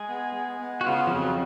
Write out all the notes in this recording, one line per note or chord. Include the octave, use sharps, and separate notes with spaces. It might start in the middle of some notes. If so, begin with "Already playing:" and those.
Already playing: G#3 G#4
B3
G#3
B3
F#4
C#3 F4
F3
F2 F#3